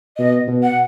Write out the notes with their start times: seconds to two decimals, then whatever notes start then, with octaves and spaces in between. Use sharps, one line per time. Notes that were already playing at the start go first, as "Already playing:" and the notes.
0.18 B2 D#5
0.48 B2
0.63 F#5